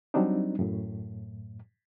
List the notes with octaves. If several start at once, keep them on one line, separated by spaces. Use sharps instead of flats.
F#3 G3 C4 D4 D#4
F#2 A2